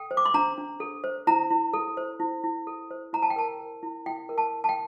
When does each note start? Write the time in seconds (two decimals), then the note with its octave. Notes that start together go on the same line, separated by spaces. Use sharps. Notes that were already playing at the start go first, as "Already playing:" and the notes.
Already playing: A4 G5
0.11 C5
0.17 D6
0.25 C6
0.34 D4 A#5
0.58 D4
0.80 A4
1.04 C5
1.27 E4 A#5
1.50 E4
1.74 A4
1.97 C5
2.20 E4
2.44 E4
2.67 A4
2.91 C5
3.13 E4 A#5
3.22 A5
3.30 G5
3.36 A#4 A5
3.60 A#4
3.83 E4
4.06 E4 G5
4.29 A#4
4.38 A5
4.54 A#4
4.64 A5
4.69 G5